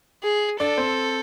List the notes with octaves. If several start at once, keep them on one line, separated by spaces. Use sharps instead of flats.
G#4
D4 A4 D5
C4 C5